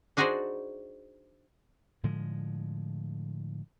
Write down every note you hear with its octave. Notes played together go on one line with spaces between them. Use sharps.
D4 D#4 F#4 G#4 C5 D5
A2 D3 F3 G#3